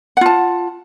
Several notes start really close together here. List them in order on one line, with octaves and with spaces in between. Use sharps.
F#5 F4 A5